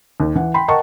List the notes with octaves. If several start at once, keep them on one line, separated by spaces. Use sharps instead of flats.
D#2
E3 F#5
G5 B5 C6
A#4 D#5 F#5 G5 A5 C#6